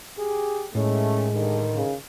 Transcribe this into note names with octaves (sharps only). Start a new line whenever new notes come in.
G4 G#4
A2 D#3 G#3 A3 C#4
G2 D3 D#3
C#3